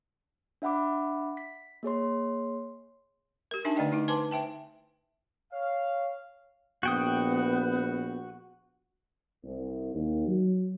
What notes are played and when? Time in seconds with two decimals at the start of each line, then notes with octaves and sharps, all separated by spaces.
0.62 D4 E5 F#5 B5 D6
1.37 B6
1.83 A#3 G#4 C#5 C6
3.51 G4 A#4
3.65 D4 D#4 G4 E5 G#5 A5
3.76 D3 A3 D5 D#5 G5
3.91 A3 D#4 E4
4.08 B4 C5 G#5 A5 C6 D6
4.31 C5 E5 G5 A5
5.53 C#5 F5
6.83 A#1 B3 F#4 G5 D#6
9.44 C2
9.94 D#2
10.28 F#3